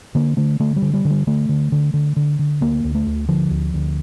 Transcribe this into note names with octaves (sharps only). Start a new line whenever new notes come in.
D3 A#3
D3 A3
D3 A3
G3
D3
G3
D3
G3
D3 A3
D3
D3
D3
D3
D3
D2 A#3
D2
A3
D2
D3 F3
D2
D2